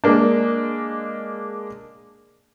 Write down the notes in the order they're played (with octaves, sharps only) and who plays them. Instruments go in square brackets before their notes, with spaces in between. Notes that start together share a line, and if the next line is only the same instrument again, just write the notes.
[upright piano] G#3 A#3 D4